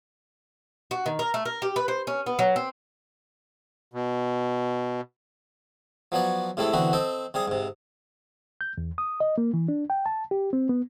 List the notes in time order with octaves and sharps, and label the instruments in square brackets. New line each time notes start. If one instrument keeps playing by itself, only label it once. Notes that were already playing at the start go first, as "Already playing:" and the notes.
[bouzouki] F#4
D#3
A#4
A3
A#4
G4
B4
C5
C#4
B3
F#3
C4
[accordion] B2
[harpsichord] F3 F#3 B3 C#5 D5
A2 C3 G#3 A3 E4 A4
D3 E3 B3 C4 F#4
C4 A4 D#5 G5
C3 G3 G#4 D#6
G#2 C3
[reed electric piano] G6
E2
D#6
D#5
A#3
E3
D4
G5
A5
G4
C4
B3